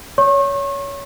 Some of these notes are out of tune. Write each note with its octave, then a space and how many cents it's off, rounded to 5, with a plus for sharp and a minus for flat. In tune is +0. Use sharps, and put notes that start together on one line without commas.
C#5 +20 C#6 -35